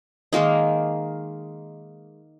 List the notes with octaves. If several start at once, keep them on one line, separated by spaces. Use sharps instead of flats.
D#3 G#3 A#3 D#4